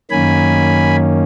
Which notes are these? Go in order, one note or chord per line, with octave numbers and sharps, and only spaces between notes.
F#2 D#3 A#3 C#4 G#5 B5